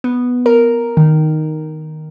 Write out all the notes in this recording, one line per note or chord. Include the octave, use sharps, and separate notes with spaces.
B3
A#4
D#3